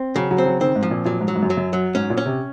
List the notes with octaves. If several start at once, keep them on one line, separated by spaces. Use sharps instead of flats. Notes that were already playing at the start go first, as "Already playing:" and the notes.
Already playing: C4
C#3 F#3
F#3
C4
F#3
D#3 C4
G#2
F3
A#2
A#2 F#3
G#2
F#3
G#2
F#2
F#3
F#2
F#3
G#2 C#4
A#2
C#4
C3